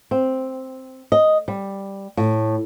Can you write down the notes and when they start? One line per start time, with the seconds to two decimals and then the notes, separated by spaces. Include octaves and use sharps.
0.11 C4
1.12 D#5
1.48 G3
2.17 A2